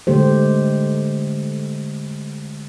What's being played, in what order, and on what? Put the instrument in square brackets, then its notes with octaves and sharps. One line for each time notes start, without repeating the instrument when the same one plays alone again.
[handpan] D3 G#3 A3 G4 C5